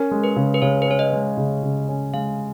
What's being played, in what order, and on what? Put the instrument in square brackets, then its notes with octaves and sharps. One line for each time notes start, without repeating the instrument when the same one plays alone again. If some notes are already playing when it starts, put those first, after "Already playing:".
Already playing: [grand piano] C#4 [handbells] A#4
[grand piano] G#3
[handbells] B4
[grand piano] C#3
[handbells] B4
[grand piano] C#3 [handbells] C#5
[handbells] B4
[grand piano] C#4 [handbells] C#5
[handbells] D#5
[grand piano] G#3
C#3
C#3
C#4
[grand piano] G#3 [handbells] F5